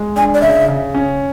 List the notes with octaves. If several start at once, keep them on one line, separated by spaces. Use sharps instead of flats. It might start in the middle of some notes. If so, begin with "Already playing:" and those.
Already playing: G#3
D4 G#5
D5
C#3 E5
C#3
C#4